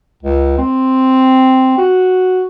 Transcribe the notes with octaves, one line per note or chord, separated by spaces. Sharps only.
C#2
C4
F#4